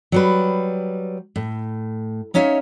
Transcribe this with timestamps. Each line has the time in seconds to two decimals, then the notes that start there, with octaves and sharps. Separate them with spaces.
0.12 F#3 G3 B4
1.36 A2
2.34 C#4 D#4 C#5 E5 F5